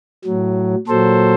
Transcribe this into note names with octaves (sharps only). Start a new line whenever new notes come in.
A2 F#3
A#2 F#3 A4 C5